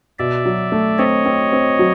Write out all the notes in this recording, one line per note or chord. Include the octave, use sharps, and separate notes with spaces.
B2 D5 E5
F#3
A3
C4 C#5 D#5
C4
C4
F#3